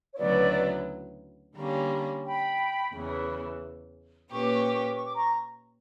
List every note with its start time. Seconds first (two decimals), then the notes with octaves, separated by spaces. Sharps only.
0.14 C#5
0.18 D2 C#3 F#3 B3 E4 B4 D5
1.55 D3 G3 A#3 C#4
2.24 G5 B5
2.94 E2 C#3 E3
4.31 A#2 A#3 C#4 G4 B4 C#6
4.42 D6
4.53 C#6
4.63 D6
4.73 C#6
4.84 D6
4.95 C#6
5.04 D6
5.15 A#5 C#6